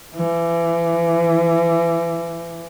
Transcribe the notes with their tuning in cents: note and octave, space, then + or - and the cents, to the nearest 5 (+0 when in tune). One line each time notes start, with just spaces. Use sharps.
E3 +30